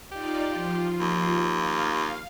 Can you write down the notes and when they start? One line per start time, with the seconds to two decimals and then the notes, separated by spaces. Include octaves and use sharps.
0.12 D#4 F4 G4 D5
0.52 F3 F4
1.00 D#2
1.56 F5